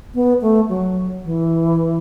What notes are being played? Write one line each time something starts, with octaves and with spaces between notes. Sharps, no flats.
B3
A3
F#3
E3